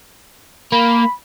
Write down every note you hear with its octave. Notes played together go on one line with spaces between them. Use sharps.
A#3 B5